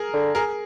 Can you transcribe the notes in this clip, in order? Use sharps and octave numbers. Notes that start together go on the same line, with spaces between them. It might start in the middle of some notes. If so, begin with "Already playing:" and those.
Already playing: G#4 A#4
D3
G#4 A#4